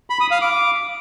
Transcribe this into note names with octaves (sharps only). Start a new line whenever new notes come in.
B5
D#6
F5
D6